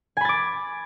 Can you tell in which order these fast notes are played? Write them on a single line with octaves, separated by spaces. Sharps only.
G#5 B5 A6 D6